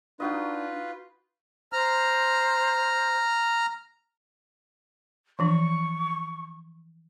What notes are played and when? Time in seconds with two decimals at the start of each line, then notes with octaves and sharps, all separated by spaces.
0.20 D4 D#4 F4 F#4 B4 D#5
1.73 C5 A#5 F6
5.39 E3 F3 D4 C#6